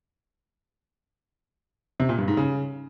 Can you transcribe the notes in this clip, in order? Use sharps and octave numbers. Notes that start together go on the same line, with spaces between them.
C3
A#2
G2
G#2
C#3